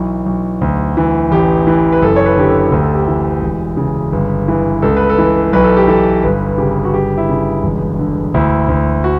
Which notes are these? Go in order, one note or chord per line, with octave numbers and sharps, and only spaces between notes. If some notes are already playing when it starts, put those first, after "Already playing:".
Already playing: B1 E3 F#4
B1
D2
E3
A1 G4
E3
B4
F#1 A4
C#5
B4
D3 G4
A4
D2 G4
A4
G4
E3
E1
C#3
G1
E3
C#2 A4
B4
A4
E3
B1 B4
A4
G4
E3 A4
G1 B4
C#3 G4
F#4
G1 G4
E4
C#3
E1
D3
D2 E4
D2
F#4